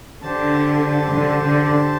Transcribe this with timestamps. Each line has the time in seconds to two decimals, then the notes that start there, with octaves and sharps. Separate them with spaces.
0.22 D3 G4 C5 A5
1.11 D3
1.41 D3